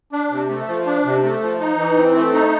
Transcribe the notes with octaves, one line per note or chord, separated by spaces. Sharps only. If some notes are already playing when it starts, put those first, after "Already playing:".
D4
C3
A3
F3
D4
C3
A3
F3
D#4
E3
C4
A3
D#4